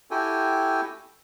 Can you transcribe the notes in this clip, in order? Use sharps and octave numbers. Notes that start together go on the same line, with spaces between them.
E4 F#4 G4 A4 G5 G#5